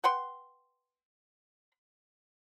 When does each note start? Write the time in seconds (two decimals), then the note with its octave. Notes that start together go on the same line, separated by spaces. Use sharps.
0.04 B4 F#5 G5 C6